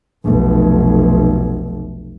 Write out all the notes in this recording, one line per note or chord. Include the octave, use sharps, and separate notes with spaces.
F1 B1